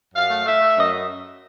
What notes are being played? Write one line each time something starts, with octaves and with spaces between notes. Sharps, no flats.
F#2 F5
A3
A3 E5
A3
F#2 D#5